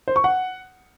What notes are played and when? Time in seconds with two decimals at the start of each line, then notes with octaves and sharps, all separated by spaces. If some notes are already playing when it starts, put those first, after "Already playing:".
0.08 C5
0.16 C#6
0.24 F#5